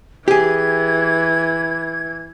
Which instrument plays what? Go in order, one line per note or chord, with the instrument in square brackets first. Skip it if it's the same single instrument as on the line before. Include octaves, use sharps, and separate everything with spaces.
[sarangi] E3 [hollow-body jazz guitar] G4 G#4 [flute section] G#6